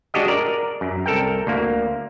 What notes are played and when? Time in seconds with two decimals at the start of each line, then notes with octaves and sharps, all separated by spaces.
0.14 G#3 D4 F#4 G4 D#5
0.28 A#4 D5
0.81 F#2
1.06 C2 A4 A#4 G5
1.47 D2 A#3